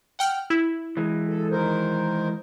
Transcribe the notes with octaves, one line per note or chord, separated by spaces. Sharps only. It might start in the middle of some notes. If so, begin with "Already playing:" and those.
F#5 G5 F6
E4
E3 G#3
A4
D#3 A#4 C5